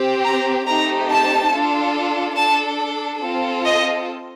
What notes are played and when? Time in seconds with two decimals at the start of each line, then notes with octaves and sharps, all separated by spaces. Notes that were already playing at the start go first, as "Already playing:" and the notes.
Already playing: C4 G4
0.24 A#5
0.66 A3 C4 D#4 G4 A#5
1.10 A5
1.52 D4 F4 A4
2.36 D4 A4 A5
3.21 C4 F4 A4
3.65 D#5